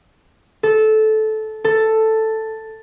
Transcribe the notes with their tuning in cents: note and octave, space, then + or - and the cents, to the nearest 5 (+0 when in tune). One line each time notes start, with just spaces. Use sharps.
A4 -15
A4 +5